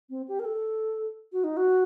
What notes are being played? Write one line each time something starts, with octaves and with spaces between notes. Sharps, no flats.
C4
G4
A#4
A4
F#4
D#4
F#4